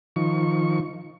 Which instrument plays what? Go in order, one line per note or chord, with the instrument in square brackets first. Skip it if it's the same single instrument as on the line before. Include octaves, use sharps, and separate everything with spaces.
[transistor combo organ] D#3 F3 C#6